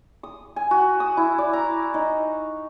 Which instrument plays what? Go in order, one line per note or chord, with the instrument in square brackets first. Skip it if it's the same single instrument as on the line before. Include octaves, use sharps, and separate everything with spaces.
[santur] D#6
G#5
F#4
D#6
E4
D5
A#5
D#4